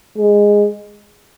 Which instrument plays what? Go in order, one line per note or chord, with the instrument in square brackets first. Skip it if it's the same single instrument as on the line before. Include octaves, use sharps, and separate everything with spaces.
[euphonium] G#3